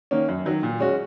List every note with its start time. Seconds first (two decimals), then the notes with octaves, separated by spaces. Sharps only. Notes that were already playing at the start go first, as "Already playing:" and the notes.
0.11 D#3 A#3 C#4
0.29 F#2
0.45 D#3 F#3
0.63 A#2
0.80 G#3 C#4 F#4